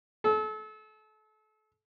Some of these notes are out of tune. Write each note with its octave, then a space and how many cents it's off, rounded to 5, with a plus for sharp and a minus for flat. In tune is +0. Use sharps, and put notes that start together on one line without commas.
A4 -35